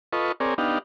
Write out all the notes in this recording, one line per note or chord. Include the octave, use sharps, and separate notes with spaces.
F4 A4 B4 D#5 C#6
C4 G#4 A#4 C#5 D5
B3 D4 D#4 G4 F5